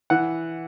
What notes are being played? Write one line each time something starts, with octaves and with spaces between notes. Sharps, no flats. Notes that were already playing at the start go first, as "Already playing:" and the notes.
E3 F#5